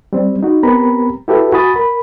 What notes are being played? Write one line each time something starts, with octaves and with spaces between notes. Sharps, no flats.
G3 C4
D#4 F#4
B3 C4 G4 A#4 A#5 B5
E4 F#4 G4 A4 B4 E5
F#4 G#5 B5 D#6 A6
A#4 B5